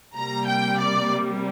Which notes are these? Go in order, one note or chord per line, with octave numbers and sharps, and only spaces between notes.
C3 G3 A#3 A#5
G5
D5